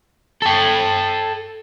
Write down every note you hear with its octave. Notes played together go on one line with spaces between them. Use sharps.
A4 G5